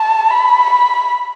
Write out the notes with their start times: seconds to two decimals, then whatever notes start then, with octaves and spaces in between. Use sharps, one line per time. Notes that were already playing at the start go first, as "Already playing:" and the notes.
Already playing: A5
0.31 B5
0.70 B5